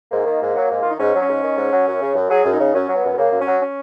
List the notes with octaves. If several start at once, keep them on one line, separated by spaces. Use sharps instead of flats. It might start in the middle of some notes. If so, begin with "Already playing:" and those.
G#2 A#3
D#3
G#2
F#3
G#2
D#3 F4
D#4
G#2 C#4
F#3
C#4
G#2
D#3
G#2
F#3
F#2
C#3
F#2
F#3 G#4
F#2
D#4
C#3
F#2 C#4
F#3
B3
F#2
C#3 A#3
F#2
C#4
F#3
C#4